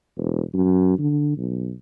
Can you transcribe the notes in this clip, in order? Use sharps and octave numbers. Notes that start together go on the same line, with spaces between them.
E1
F#2
D3
B1